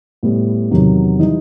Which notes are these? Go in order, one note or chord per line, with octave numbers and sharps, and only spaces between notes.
A2 G3 B3
E2 C3 D#3 F#3
E3 G3 D#4